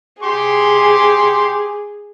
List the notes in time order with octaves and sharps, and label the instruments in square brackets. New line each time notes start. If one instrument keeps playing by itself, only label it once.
[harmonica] G4 C6 D6 [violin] G#4